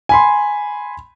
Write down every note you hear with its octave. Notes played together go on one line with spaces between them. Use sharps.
G#5 B5 C6